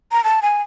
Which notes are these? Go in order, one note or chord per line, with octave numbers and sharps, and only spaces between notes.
A#5
A5
G#5